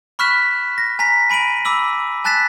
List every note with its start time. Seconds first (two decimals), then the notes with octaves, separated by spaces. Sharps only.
0.19 B5 C#6 F6 F#6 B6 E7
0.78 A#6
0.99 G#5 A#5 A#6 B6
1.30 G#5 B5 D7 D#7 F#7
1.65 B5 D6 E6 F#7
2.24 G#5 A5 F#6 A6 B6 E7